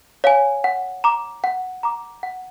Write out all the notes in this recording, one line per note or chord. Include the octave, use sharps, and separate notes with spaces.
C#5 F5 G#5
F#5
A#5 D6
F#5
A#5 D6
F#5